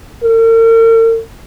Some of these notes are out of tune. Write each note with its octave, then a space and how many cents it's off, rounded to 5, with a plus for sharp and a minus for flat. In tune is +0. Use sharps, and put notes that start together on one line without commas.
A#4 -45